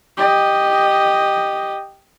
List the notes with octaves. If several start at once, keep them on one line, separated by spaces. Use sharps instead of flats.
G4 D#5